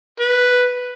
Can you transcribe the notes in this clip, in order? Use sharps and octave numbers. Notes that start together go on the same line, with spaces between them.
B4